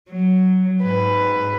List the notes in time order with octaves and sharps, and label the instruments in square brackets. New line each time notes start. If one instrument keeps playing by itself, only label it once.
[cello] F#3
[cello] G#2 [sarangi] B4